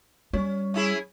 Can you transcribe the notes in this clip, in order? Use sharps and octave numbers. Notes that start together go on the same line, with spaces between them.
G3 C#4
C#4 E4 G#4